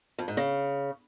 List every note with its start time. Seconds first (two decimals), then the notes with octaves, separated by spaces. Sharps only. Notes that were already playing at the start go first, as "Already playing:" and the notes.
0.19 F2
0.28 G#2
0.37 C#3